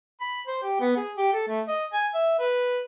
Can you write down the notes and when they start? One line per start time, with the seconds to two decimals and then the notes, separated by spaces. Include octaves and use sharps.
0.20 B5
0.47 C5
0.63 G4
0.80 B3
0.97 G#4
1.17 G4
1.33 A4
1.48 A3
1.68 D#5
1.93 G#5
2.14 E5
2.39 B4